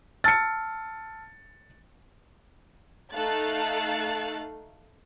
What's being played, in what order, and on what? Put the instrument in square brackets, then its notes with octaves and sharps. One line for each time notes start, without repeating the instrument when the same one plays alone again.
[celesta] A5 E6 F6 [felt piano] A6 C#7
[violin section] A3 D#4 A4 F5 F#6 A6